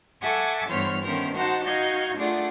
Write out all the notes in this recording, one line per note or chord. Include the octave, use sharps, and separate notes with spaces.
A4 E5 F#5 G#5 C#6 D6
G2 E3 B3 C5 C#5 F6
D#3 A3 B3 C#4 A#4 C5
D#4 F#4 C5 F#5 A5
D#4 F#4 D#5 F5 G6 G#6
A3 D4 F4 G#4 D5 F#5